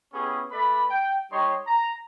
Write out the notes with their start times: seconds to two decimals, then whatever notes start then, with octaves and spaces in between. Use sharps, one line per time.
0.13 B3 C#4 E4 G4 G#4
0.51 A3 B4 D5 B5
0.89 G5
1.32 G3 D#4 G4 C#5 D#5 C6
1.67 A#5